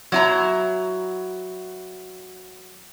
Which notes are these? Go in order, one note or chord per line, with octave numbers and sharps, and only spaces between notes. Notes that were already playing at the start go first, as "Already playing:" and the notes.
F#3 E4 A#5